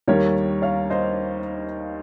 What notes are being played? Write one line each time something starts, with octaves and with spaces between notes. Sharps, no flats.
D#2 D#3 G3 A#4 C#5
C#5 F5
C5 D#5